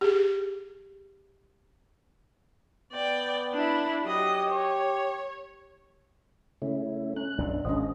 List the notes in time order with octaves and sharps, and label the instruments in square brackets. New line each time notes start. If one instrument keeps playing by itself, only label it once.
[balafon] G4 G#4
[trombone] B3 [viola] D5 G5
[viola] D4 E4
[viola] F#3 D#5 [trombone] G4
[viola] C#5
[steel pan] C#3 [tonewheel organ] A3 C#4 E4
[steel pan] C#4 [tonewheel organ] F#6
[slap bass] B1 F#2 [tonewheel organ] D4
[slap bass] G#1 [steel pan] C#4 D4 C5 [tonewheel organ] D#5